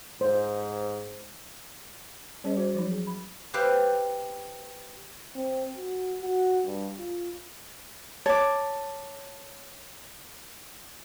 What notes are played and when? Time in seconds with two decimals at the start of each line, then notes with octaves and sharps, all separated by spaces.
0.21 G#2 C5
2.44 G3 C#4 G#4 C5 D#5
2.57 F#4 C5
2.75 F3 F#3 D#4
2.90 G#4
3.07 B5
3.54 G4 B4 C5 E5 F5 G5
5.35 C4
5.77 F#4
6.21 F#4
6.66 G2
6.99 F4
8.26 C#5 A5 D6